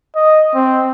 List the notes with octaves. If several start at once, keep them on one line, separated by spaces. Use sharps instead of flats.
D#5
C4